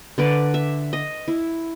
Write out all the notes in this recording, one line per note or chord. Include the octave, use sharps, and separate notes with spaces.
D3 B4 D5
E5
D#5
E4